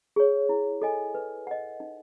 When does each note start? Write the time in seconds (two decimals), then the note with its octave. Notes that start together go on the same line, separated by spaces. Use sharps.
0.16 G#4 C#5
0.49 E4
0.82 A4 D#5 G#5
1.15 B4
1.47 D#5 F#5
1.80 D#4